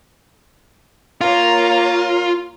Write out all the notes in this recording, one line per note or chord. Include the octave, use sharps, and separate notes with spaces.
A#3 F4 C#5 A#5